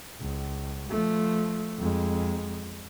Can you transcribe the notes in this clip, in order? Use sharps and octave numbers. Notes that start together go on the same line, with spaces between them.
C#2
F3 A3
F2 G#3